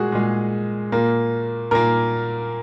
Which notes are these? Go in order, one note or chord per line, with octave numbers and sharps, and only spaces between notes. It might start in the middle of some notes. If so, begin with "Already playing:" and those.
Already playing: A#2 G#3 F#4 G#4
A#2 G#3
A#2 A#3
A#2 A#3 A#4